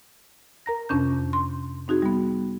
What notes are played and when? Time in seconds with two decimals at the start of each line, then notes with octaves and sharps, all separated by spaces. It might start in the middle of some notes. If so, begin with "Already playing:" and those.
0.66 A#4 A#5 A#6
0.89 F2 C3 C#4 D4 G6
1.33 C6
1.88 C4 D#4 F#4 G#4
2.02 G3 B3